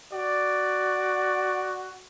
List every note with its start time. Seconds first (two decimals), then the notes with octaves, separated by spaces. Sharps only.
0.13 F#4 D5